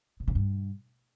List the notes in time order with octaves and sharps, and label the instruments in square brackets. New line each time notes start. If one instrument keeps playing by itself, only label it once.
[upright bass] C3
C#3
G2